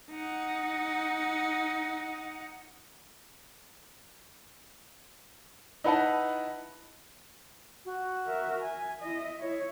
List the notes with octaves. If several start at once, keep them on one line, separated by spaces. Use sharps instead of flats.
D#4 F#5
D#4 E4 B4 F#5 A5
F#4
A#4 E5
E5 G#5
E4 D#5
E4 C#5